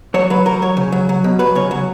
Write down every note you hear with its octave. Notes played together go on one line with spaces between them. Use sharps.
F#3 C#5
F#3 B4
F#3 A#4
F#3 C#5
C#3
F#3
F#3
B2
F#3 B4
C#3 C#5
F#3